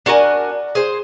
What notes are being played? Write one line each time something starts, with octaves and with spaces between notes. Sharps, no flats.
D4 F#4 A#4 G#5
G#4 C5